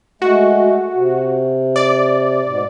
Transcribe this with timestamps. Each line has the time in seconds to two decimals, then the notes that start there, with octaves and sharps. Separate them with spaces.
0.22 G#3 A3 F#4
0.95 C3
1.76 D5
2.46 G#2 B2